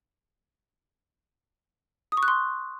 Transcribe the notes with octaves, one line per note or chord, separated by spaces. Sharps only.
D#6
C#6
F#6
C6